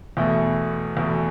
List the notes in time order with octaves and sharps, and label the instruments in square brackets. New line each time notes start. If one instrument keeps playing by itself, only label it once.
[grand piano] E2 B2 A3
E2 B2 A3